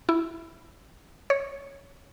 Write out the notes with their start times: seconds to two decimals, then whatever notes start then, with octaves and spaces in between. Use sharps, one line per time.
0.09 E4
1.30 C#5